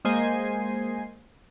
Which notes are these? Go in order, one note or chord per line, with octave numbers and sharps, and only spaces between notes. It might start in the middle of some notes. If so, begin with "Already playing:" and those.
G#3 A#3 C5 D#5 G#5 C7